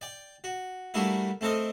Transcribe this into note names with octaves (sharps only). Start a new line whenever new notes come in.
D5 G5
F#4
G3 A3 A#3 D4 E4 F#4
A3 C4 A4 A#4 D#5